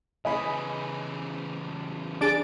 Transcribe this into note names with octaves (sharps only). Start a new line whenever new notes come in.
C#3 E3 D#5 G#5 B5
D4 G#4 A6 D7